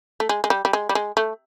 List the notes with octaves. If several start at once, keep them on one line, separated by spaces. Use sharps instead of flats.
A3
G#3
G#3
G3
G3
G#3
G3
G#3
A3